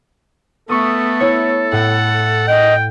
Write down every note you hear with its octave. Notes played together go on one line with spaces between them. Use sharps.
A3 B3 A4 C#6 D#6
E4 C#5
A2 F#5
D#5 G5